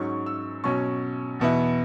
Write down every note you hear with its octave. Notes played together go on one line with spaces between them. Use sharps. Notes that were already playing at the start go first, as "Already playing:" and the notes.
Already playing: G#2 F#3 C#4 C#6
E6
B2 F#3 C#4 C#6
E2 B2 B3 E4